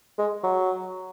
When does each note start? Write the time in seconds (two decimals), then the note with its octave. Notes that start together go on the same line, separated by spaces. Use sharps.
0.19 G#3
0.44 F#3